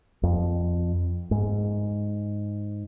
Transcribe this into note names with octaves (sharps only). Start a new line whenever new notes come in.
F2
G#2